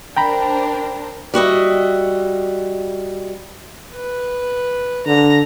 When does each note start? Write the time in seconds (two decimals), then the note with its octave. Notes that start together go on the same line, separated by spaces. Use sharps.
0.17 D4 A#4 C5 G5 A#5 B5
1.34 G3 F#4 D#5 E5
3.94 B4
5.06 D3 A#5